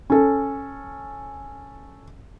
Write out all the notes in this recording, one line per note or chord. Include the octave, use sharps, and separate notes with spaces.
C#4 A4